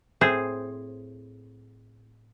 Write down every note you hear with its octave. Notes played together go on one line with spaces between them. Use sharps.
A2 C4 G#4 C5